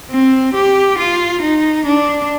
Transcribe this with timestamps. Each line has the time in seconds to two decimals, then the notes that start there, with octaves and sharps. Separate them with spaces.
0.11 C4
0.54 G4
0.98 F4
1.42 D#4
1.85 D4